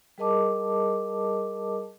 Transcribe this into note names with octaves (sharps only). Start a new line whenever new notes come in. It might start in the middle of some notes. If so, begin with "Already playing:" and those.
G3 G#4 A#4 D#5 A5 D6